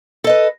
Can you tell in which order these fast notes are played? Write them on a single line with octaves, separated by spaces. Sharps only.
A4 D#5 B4